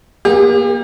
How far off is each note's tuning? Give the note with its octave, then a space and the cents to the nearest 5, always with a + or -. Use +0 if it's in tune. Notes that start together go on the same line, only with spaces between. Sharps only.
A#3 +35 G4 +40